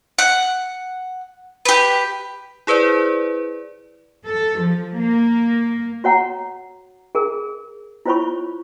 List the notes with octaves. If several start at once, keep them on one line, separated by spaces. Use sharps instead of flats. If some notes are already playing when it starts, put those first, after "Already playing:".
F#5
G4 B4
E4 G#4 B4 C5 D5
A4
F3
A#3
F#4 C#5 F#5 A#5
G#4 A#4
E4 F4 C5 C#5 B5 C#6